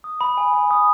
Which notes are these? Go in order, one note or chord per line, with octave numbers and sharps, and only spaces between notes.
D#6
B5
G#5
G#5
D#6